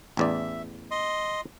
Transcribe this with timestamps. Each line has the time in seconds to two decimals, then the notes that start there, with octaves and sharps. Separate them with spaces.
0.17 A1 E2 D5 E5
0.91 D#5 C6